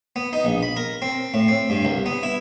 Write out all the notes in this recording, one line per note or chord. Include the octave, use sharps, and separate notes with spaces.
B3
D#4
A#1
B5
A#4
C4
A2
C4
G2
C2
B3
E4